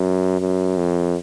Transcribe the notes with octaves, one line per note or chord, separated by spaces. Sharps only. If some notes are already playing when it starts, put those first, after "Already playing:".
Already playing: F#2
F#2
F2